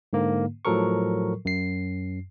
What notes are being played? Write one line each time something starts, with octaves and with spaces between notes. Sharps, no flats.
G#2 D3 A#3
A2 F3 F#3 A4 A#4 C#6
F#2 C7